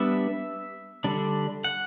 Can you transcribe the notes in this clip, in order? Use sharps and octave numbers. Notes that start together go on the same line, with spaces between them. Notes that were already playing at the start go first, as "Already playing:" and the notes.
Already playing: G3 B3 D4 E5
D3 G3 D4
F#5